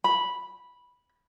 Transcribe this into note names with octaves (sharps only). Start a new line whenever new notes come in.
B5